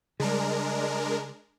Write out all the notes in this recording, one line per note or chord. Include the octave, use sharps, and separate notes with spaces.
C#3 G3 G#3 D4 A#4